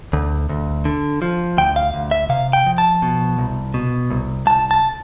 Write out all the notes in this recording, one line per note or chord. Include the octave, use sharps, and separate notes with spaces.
D2
D2
D3
F3
D2 G5
F5
D2
E5
C3 F5
G5
F3
A5
B2
C2
B2
C2
C2 A5
A5